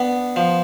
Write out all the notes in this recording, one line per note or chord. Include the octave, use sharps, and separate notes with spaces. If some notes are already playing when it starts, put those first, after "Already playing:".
Already playing: B3 D4
F3